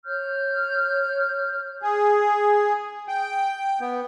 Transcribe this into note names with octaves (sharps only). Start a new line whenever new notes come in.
C#5 F6 G6
G#4
G5
B3